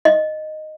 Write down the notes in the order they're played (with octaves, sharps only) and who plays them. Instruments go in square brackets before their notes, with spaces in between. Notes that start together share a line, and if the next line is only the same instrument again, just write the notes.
[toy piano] D#5